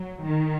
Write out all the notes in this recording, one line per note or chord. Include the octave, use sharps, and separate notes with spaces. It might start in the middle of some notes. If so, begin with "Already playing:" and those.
Already playing: F#3
D#3